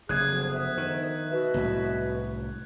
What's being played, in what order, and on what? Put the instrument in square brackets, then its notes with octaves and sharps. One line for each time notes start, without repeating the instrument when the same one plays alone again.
[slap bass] F#1 C3 [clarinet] G#4 [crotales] F#6 G#6
[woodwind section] D2 F3 B3
[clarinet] E5
[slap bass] D#3
[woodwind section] B2 F#4 B4 [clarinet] E5
[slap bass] C2 A2 F#3